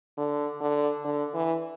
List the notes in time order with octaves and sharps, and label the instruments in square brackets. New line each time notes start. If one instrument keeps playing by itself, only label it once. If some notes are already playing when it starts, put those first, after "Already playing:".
[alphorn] D3
D3
D3
E3